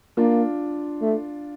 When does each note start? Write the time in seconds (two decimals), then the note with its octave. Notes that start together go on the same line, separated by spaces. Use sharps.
0.17 A#3 D4 F4
1.01 A3